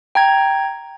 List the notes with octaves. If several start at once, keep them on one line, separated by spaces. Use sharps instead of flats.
G5 A#5 G#6